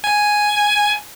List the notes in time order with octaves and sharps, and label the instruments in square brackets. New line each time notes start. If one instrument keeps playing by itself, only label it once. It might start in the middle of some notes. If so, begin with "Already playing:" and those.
[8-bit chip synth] G#5